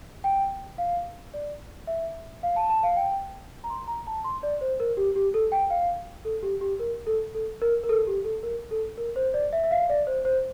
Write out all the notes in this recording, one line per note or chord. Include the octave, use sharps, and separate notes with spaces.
G5
F5
D5
E5
F5
A5
A5
F5
G5
A#5
C6
A#5
A5
C6
D5
C5
A#4
G4
G4
A4
G5
F5
A4
G4
G4
A#4
A4
A4
A#4
A#4
A4
G4
A4
A#4
A4
A#4
C5
D5
E5
E5
F5
D5
C5
C5